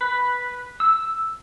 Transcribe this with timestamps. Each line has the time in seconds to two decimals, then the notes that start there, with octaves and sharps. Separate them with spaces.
0.01 B4
0.80 E6